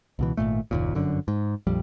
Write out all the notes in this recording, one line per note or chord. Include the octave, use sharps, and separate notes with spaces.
C#2 B2 E3
G#1 F#2 A#2 A3
F#1 D#2 A#2
G1 F#2 D3
G#2
A#1 F2 G3